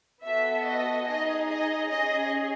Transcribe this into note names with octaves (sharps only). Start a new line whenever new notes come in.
B3 F#4 A4 E5
D#5
D#4 G#4 D#5
D#5
C#4 G#4 D#5